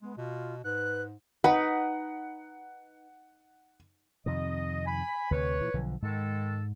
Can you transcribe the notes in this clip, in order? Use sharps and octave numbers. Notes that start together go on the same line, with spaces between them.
G#3 B3
B2 F4
G#2 B4 F#6
D#4 B4 F#5
F2 C3 D#3 D#5
G#5 B5
D2 C3 B4 C#5
A#2 E3
B1 D3 F3
G#2 D#3 G#3 A4